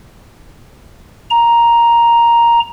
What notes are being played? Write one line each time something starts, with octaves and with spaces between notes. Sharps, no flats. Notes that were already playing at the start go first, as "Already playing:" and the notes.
A#5